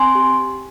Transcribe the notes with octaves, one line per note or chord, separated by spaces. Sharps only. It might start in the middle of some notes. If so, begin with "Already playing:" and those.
Already playing: C4 G#5 C6
G4